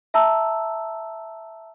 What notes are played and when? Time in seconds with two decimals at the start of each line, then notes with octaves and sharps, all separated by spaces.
0.14 E5 A5 A#5 E6